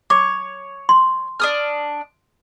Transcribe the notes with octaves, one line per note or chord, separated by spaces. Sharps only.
C#5 D6
C6
D4 D#6 F6